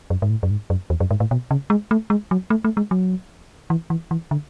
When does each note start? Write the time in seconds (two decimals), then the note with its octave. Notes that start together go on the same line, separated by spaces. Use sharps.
0.10 F#2
0.22 G#2
0.30 A2
0.43 F#2
0.51 G#2
0.70 F#2
0.90 E2
1.00 F#2
1.11 G#2
1.20 A2
1.31 B2
1.51 C#3
1.70 G#3
1.91 A3
2.10 G#3
2.31 F#3
2.50 A3
2.64 A3
2.77 G#3
2.91 F#3
3.70 E3
3.90 E3
4.11 E3
4.31 D3